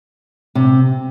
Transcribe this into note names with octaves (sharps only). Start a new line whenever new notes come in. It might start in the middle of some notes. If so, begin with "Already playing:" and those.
C3